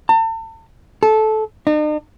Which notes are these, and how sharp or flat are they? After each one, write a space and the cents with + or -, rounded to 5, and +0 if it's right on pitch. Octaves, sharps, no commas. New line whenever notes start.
A5 +40
A4 -15
D#4 -45